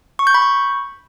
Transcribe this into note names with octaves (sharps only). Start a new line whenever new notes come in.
C#6
G6
B5
C#6